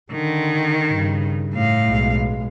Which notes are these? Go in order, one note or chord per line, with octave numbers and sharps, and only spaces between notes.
D3 D#3
G2 C#3
A2 F5
B1 G#3